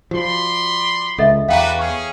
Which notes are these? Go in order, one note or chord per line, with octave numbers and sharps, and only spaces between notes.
F3 F#4 D5 B5 C6
C#2 A4 D#5 E5
E2 D4 F#4 B4 F5 G5 A#5
C#4 G#4 C#6